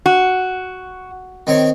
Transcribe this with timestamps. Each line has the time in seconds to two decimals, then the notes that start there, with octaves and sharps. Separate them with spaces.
0.06 F#4
1.47 D#3 C4 C#5